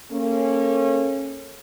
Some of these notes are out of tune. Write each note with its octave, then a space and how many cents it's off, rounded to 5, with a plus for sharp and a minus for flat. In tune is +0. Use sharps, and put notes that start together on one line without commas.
A#3 -30 C#4 -25 A4 -40